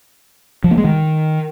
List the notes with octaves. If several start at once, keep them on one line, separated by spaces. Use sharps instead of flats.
F3
A#3
G#3
D#3